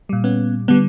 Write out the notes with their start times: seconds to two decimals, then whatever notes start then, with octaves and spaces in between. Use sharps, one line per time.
0.09 A#2 G3
0.24 B3 C#4
0.68 D3 G3 B3